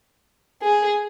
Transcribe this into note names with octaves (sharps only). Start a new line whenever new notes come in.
G#4